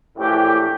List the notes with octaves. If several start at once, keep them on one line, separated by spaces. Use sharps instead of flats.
A#1 A2 E3 G4